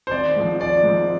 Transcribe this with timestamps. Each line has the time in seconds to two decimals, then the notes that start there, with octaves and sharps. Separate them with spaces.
0.07 C5
0.11 G#1 D5
0.36 G#2 F3
0.60 G#1 D5
0.84 G#2 F3